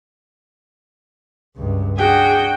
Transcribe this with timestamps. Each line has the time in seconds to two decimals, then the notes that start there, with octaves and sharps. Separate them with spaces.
1.56 C#2 G2
1.98 D4 F#4 G#4 G5